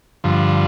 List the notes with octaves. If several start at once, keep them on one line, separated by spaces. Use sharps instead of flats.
G2 D3 F3